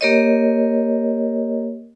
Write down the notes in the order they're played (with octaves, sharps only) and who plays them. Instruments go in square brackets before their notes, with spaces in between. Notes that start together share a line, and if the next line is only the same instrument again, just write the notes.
[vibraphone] A#3 G4 A#4 C#5 D#5